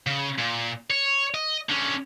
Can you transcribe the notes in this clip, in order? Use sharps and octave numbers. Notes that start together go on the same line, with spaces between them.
C#3
A#2
C#5
D#5
D3 C#4